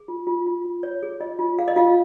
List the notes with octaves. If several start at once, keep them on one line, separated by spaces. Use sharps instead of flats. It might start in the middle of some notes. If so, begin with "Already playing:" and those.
Already playing: G#4
F4
F4
F4
F4
C#5
G#4
F4 D#5
F4
G#4 F5
D#5
F4 F5